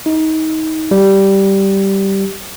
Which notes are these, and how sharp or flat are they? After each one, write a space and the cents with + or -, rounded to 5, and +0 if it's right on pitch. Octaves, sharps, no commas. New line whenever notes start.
D#4 +25
G3 -10